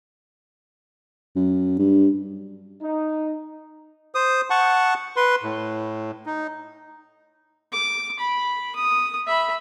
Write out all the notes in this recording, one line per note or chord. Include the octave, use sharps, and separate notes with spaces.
F#2
G2
D#4
C5 D#6
F#5 A5 C#6
B4 C6
A2
D#4
D6
B5
D#6
E5 B5